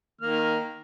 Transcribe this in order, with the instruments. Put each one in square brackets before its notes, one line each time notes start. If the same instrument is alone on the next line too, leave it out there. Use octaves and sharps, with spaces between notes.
[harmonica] D#3 A#3 F6